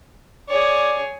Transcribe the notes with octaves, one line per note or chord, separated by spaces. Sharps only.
G#4 C#5 D5